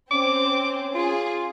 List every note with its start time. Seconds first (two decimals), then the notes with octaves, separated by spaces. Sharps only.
0.11 C4 C#4 D6
0.95 F4 G#4